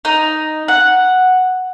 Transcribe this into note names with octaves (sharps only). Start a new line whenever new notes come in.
D#4
F#5